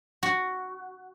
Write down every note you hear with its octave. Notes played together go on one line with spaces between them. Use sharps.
F#4